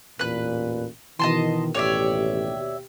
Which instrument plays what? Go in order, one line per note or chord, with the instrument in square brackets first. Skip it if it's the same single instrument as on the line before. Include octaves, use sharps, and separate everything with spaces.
[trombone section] A1 E2 A#2 [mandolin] B4 F#6
[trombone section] B2 D#3 [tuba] E3 [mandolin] D#5 A5 C6
[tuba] A1 [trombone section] D#2 B2 G4 [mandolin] C#5 D5 E5